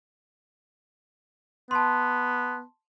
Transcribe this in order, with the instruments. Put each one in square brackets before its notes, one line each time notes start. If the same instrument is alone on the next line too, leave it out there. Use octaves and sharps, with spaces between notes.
[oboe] B3 [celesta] A5 C6